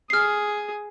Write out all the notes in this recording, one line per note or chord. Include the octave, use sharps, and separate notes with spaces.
G#4 D#6 F6 C7